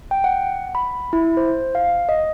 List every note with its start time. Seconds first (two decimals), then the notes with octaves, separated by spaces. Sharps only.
0.11 G5
0.24 F#5
0.75 B5
1.13 E4
1.37 C5
1.75 F5
2.09 D#5